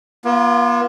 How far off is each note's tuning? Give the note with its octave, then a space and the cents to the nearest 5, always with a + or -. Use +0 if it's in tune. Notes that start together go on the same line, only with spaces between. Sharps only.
B3 -45 F4 -15